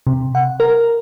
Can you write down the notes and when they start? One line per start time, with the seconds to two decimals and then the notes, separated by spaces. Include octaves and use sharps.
0.07 C3
0.35 F#5
0.60 A#4